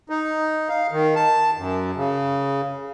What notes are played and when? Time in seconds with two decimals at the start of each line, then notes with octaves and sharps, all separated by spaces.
0.09 D#4
0.69 F5
0.91 D#3
1.16 A5
1.57 F#2
1.96 C#3